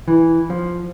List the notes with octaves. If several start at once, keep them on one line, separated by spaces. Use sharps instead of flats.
E3
F3